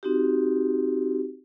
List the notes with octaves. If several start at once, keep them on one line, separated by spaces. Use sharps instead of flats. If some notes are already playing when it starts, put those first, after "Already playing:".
C4 D#4 F#4 G4